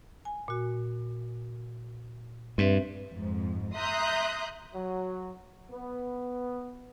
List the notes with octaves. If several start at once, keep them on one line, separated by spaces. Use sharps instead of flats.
G#5
A#2 F#4
G2 C4 B4 E5
F2 G#2
E5 A#5 C6 D#6 F#6 G6
F#3
B3